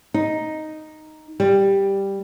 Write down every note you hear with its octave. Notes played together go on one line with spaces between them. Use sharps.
D#4
G3